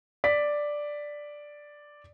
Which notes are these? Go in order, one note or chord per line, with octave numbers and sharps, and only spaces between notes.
D5 B6